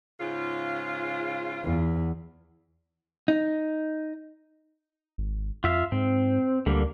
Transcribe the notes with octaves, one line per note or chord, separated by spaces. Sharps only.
G#2 C#3 F4
E2
D#4
G#1
F2 F4 E5 F5
G#2 C4
D2 D3 G3 A#3